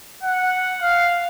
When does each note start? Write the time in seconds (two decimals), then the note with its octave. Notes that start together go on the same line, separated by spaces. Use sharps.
0.23 F#5
0.82 F5